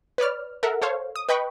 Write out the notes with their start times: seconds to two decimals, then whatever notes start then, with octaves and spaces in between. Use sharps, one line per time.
0.18 B4 C#5 D5 F6
0.63 A4 A#4 E5 F#5
0.82 A4 C5 C#5 F5
1.16 D#6
1.29 B4 D#5 G5 B5 C#6